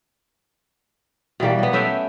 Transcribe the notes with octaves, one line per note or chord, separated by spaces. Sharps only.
B2 E3 G3 A#3
F#3 B3
A3 C#4 E5 G5